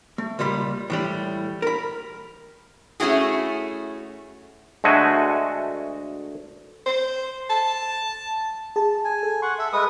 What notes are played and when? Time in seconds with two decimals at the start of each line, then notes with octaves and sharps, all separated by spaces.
0.18 A3
0.39 C#2 A#2 G3 B5
0.90 A2 E3 G3
1.62 A#4 B5
3.00 A3 C#4 E4 F#4 G#4
4.84 D2 G#3 A3 F#4 G#5
6.86 C5
7.50 A5
8.76 G#4 A5
9.05 G#5
9.23 A4
9.42 F#5 C6 C#6
9.59 A4 E5
9.73 G#3 B4 D#6